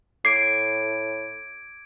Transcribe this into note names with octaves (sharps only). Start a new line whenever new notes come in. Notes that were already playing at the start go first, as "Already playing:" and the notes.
A2 D6 G#6 C7 D7